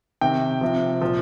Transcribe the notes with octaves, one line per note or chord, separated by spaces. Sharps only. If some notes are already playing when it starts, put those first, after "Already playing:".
C3 D#3 G5
C3 F3
A#2 F3